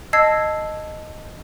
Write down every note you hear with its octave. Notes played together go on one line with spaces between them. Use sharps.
D#5 A5 E6 G#6 C7